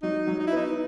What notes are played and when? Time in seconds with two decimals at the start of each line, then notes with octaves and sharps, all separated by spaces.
0.03 F#3 D#4
0.27 F#3
0.40 D#4
0.47 E4
0.52 B3 D#4